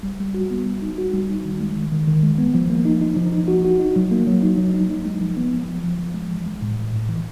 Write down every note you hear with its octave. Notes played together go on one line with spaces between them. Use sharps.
G3
G3
F#4
B3
G3
D#4
F#4
G3
D#4
D#3
G#3
D#3
D#3
D#3
G#3
B3
F3
A#3
D#4
D#4
F3
D#4
F#4
F#4
D#4
F#3
A#3
F#3
D#4
F#3
D#4
D#4
G#3
F3
B3
F3
F3
F3
F3
G#3
E3
G#3
A2
A2
A2
E3